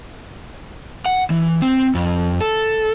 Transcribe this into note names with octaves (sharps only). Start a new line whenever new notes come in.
F#5
E3
C4
F2
A4